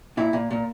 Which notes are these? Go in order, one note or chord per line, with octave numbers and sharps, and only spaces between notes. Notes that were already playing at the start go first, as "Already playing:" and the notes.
A#2 E4
A#2
A#2